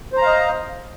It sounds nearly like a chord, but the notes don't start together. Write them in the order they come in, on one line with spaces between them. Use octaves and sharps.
C5 A#5 F5 D#5